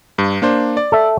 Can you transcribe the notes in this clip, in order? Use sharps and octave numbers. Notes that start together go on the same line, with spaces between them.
G2
A#3 D4 C5
D5
A4 E5